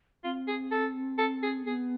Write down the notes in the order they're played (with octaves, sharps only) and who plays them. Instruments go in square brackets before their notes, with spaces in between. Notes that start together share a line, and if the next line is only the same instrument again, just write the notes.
[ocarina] C4 [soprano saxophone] F4
[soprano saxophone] G#4
A4
A4
G#4
[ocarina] B3 [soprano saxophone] G#4